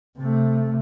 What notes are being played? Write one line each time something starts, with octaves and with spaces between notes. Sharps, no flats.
C3 A3